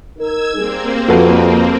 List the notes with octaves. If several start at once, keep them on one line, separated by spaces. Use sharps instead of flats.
D#4 A#4 E6 G#6
G3 A#3 C4 G#4
F2 F#4 A4 B4